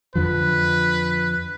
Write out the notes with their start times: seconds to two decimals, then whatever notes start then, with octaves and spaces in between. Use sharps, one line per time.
0.15 F2 D3 F3 B4